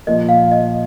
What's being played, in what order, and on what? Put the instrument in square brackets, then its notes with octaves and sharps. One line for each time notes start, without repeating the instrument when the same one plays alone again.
[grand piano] A#2 F3 A#3 [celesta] D#5
[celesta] F5
D#5